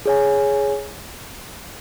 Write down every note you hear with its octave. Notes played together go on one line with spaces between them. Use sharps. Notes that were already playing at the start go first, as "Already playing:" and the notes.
G#4 C#5 G#5